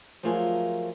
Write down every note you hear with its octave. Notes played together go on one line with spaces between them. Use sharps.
F3 F#3 A3 F4 G#4 A#4